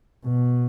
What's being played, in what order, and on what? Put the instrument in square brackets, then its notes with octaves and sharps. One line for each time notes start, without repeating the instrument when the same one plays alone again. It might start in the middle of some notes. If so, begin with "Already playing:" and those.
[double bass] B2